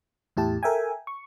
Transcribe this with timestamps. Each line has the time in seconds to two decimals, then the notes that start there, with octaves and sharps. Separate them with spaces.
0.37 E2 A2 E4 G4 A5
0.63 A4 A#4 E5 G5 G#5
1.07 C#6